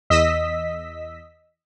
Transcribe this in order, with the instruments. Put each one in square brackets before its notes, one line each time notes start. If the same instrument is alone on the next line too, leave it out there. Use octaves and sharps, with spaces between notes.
[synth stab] E2 D#5 E6 B6